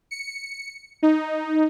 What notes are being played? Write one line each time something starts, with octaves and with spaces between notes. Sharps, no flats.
C#7
D#4